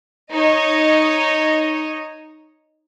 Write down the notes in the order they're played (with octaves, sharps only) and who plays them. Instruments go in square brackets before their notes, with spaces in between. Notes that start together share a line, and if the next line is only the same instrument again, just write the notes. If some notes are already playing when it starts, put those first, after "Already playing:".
[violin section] D#4 C#5 D#5